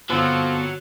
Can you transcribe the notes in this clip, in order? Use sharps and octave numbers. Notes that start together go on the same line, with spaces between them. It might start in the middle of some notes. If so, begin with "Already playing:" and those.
G2 D3 F3 F#3 B3 C4 A4